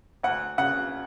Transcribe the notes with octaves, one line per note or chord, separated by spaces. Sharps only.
D2 F#5
C#3 F#5